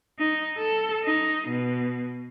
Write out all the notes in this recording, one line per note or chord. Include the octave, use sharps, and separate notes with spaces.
D#4
A4
D#4
B2